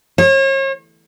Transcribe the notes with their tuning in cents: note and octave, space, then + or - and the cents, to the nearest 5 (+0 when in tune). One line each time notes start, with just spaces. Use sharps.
C#5 -40